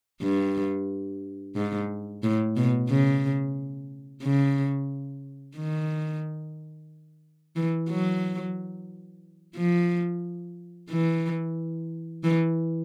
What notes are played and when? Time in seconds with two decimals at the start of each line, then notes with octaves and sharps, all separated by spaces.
0.23 G2
1.56 G#2
2.23 A2
2.57 B2
2.89 C#3
4.23 C#3
5.56 D#3
7.56 E3
7.90 F#3
9.56 F3
10.90 E3
12.24 E3